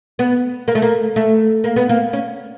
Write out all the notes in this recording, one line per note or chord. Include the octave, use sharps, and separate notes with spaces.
B3
A#3
A3
A#3
A3
A#3
B3
A#3
C#4